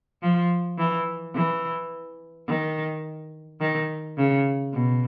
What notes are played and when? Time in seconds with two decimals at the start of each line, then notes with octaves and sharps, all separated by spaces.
0.22 F3
0.78 E3
1.35 E3
2.48 D#3
3.61 D#3
4.17 C#3
4.74 B2